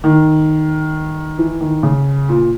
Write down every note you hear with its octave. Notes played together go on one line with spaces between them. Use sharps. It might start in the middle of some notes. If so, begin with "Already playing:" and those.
D#3
E3
D#3
C#3
A#2